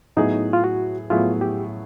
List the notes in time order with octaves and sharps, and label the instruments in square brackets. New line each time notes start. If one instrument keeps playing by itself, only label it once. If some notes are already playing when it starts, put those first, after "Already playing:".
[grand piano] A2 F#3 B3 E4 G#4 [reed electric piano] D#4
[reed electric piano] F4
F#4
[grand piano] A2 F#3 B3 E4 G#4 [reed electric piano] F4
[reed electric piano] G4